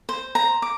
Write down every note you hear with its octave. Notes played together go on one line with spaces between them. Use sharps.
C5
A#5
D6